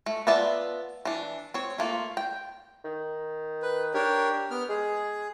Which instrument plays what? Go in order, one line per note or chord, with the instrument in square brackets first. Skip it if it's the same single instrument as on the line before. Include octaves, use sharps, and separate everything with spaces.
[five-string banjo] A3
B3 F4 D5 E5 A5
E3 D4
C4 C#5
A3 A#3 F4
G5
[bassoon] D#3
[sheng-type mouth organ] B4
[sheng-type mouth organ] D4 A#4 C#5 [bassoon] G4
[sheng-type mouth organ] B3 F6
[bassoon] G#3 [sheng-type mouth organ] G#4